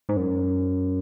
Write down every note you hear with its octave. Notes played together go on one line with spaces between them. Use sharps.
G#2
F#2